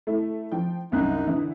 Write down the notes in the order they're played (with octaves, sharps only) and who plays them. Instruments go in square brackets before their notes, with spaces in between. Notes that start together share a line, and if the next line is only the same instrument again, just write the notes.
[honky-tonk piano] A3 E4
F3 G5
[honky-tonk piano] C2 F#2 F#6 [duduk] D#4
[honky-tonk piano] D3 E3 E4